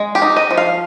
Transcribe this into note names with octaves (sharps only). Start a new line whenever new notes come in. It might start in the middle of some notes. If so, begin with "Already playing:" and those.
Already playing: G#3
G4
D#4
D#5
F3
F5